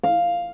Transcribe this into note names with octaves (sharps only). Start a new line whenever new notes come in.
F5